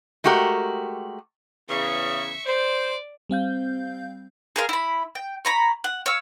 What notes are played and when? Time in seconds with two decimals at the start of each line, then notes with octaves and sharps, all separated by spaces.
0.24 G#3 A3 F#4 G4 A#4
1.68 E2 C#3 E5 C#6
2.46 C5 D5
3.29 G3 C4 F5 G6
4.56 G#4 A#4 F5
4.69 E4 B5
5.15 G5
5.45 C#5 A#5 B5
5.84 F#5
6.06 C#5 F5 E6